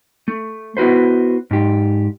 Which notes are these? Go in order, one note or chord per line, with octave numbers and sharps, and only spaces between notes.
A3
B3 E4 F#4 B4 C5
G#2 G4